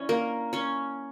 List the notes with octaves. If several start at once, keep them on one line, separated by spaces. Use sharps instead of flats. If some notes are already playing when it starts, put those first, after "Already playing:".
Already playing: E3 C#4 D4 C#5
A#3 A#4
C#4 C#5